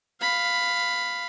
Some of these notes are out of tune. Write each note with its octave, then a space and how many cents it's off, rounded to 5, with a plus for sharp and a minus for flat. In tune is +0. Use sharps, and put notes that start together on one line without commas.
F5 +0 B5 +10